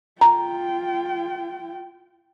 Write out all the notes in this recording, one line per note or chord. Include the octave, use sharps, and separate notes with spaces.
F4 G5 A#5